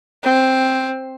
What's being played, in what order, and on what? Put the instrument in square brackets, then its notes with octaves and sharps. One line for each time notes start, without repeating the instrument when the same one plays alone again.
[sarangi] C4